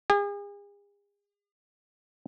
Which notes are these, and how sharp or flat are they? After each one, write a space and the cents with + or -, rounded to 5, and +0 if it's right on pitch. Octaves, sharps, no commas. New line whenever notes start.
G#4 -40